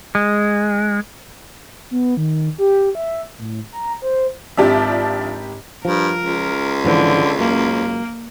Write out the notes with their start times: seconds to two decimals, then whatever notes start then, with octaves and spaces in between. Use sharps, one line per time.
0.15 G#3
1.91 B3
2.17 D#3
2.58 G4
2.95 E5
3.38 A2
3.73 A#5
4.02 C5
4.57 G#1 F3 D4 G4 E5
5.85 G2 F3 A#4
6.23 C#2
6.85 G#1 D3 E3 F3
7.39 F#2 A#3